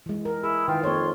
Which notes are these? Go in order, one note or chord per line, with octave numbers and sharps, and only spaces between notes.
E3 G#3
A#4
E4 G#4
D#3 E3 F4 G5
F2 A#3 C#5 C6